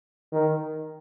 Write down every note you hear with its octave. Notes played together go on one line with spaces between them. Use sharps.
D#3